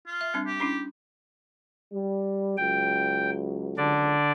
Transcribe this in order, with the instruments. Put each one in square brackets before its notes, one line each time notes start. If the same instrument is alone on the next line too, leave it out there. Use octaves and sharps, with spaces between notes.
[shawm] F4
[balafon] E5
G3 C4 D4
[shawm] G4
[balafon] C#4 D4 E4
[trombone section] G3
[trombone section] C#2 F#3 [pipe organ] G5
[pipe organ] D3 D4 D5